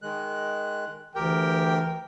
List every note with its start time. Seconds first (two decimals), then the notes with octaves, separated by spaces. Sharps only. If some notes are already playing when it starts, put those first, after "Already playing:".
0.02 D#3 G#3 F#6
1.16 D2 E3 G4 A#4 G5